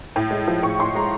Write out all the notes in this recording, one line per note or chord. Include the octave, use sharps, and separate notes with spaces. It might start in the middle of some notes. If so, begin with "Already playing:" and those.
A2
G#3
F3
A2 C#6
A2 C6
G#3 A#5